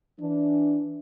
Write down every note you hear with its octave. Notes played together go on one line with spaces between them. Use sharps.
E3 D4